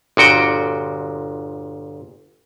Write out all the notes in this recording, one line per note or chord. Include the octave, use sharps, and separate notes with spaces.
G1 A#2 F#4 G5